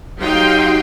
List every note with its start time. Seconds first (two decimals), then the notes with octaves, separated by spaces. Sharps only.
0.20 F#3 D#4 G4 F5 G5 C6